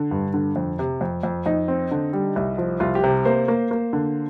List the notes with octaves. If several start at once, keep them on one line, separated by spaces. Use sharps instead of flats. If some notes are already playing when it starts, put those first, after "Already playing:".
Already playing: D3
G2
D3
F2
C3
F2
F2
F2 D#4
C4
D3
G3
C2
F3
C2 F4
G4
C3
A#3 C5
A#3
A#3
D3